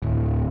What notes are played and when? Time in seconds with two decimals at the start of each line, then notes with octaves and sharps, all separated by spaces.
0.02 D1